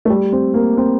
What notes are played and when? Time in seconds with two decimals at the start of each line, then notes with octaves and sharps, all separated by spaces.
0.05 A3
0.10 G3
0.32 C4
0.54 A#3
0.77 C4